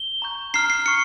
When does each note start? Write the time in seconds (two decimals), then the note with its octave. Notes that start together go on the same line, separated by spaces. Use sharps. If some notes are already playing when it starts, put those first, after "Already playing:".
Already playing: G7
0.22 A#5 C#6 G6
0.54 A#5 F6 C7
0.70 C7
0.85 C#6 F6 C#7